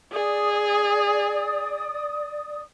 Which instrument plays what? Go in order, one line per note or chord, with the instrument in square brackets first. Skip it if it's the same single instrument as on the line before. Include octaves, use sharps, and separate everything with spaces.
[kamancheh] G#4 [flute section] D5 D#6